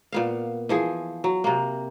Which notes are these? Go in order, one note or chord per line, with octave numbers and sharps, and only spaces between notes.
A#2 B3 F5
E3 F3 G#4
F#3
C3 A#3